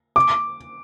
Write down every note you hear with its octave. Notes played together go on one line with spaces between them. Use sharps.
D6